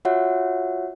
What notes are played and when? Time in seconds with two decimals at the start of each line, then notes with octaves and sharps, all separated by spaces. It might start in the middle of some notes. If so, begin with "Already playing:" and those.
0.05 F4 F#4 C#5 E5 F#5